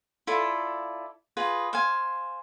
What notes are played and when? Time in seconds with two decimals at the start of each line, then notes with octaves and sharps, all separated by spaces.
0.27 E4 F4 A4 D5
1.37 F4 G#4 B4 D#5
1.73 C5 F5 G#5